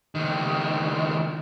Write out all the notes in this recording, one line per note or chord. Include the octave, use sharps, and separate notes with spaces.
C#2 D#3